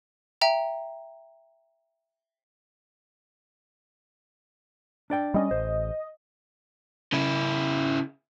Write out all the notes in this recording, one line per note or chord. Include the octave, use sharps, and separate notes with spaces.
E5 G5 A#5
D4 D5 G5
G3 C4 C#4 D#5
A1 C5
C#3 E4